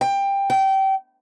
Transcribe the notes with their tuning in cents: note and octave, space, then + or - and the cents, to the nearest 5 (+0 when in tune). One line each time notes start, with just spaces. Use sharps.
G5 +15
G5 -25